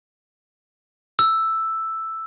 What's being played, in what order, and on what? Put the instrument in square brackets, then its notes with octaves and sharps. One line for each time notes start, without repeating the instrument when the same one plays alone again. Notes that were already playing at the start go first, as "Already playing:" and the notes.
[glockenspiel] E6